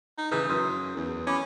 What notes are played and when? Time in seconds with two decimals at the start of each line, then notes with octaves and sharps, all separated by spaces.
0.18 D#4
0.31 C#3 E3 D#6 G6
0.48 F#2 C6 D#6
0.96 E2
1.27 C#4 B5 D6